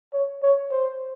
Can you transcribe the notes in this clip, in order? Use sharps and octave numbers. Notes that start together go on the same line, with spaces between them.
C#5
C#5
C5